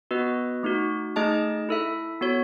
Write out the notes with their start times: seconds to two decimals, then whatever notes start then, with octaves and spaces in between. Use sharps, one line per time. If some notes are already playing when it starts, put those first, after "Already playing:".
0.11 B3 F#4 B4 D#5
0.63 A3 D#4 F#4
1.16 A3 D#4 G#4 D#5 A5
1.69 E4 A4 E5
2.21 B3 F#4 C#5